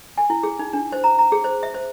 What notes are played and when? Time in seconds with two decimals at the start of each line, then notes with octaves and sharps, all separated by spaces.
0.18 G#5
0.30 E4
0.43 G#4
0.59 D#4
0.73 D4
0.92 C5
1.04 A#5
1.19 A#5
1.32 G#4
1.44 C5
1.63 E5
1.74 C5